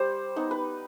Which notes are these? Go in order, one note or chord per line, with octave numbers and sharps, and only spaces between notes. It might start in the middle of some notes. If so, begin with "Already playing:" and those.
Already playing: G3 C5
B3 D#4
B4